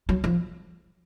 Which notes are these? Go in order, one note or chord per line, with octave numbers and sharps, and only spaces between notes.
F#3
F3